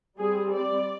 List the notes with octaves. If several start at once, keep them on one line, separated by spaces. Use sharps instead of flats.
G3 C4 G#4
D5